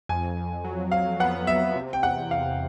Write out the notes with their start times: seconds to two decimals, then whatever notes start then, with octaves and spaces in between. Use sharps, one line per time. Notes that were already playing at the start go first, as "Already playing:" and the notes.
0.09 F2 G#5
0.37 F2
0.64 F#3
0.92 F#3 F5
1.20 B3 F#5
1.47 F2 E5
1.75 C3
1.93 G5
2.03 E2 F#5
2.31 C3 F5